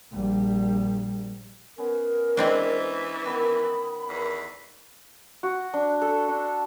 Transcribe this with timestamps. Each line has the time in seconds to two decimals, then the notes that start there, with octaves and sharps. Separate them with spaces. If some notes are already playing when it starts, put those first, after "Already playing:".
0.11 A#1 G3
1.78 B3 C#4 A#4
2.37 E3 G#3 C4 D4
3.25 D#3 B3 D#5 B5
4.09 E2 A#4
5.43 F#4
5.74 D4
6.02 A4
6.29 D4